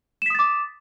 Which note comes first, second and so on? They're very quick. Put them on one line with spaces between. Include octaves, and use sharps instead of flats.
E7 B6 D#6 A6 D6